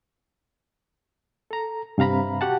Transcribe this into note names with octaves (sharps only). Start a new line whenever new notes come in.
A4 A#5
G2 C3 F5 A#5 B5
F#4 G4 F#5 A5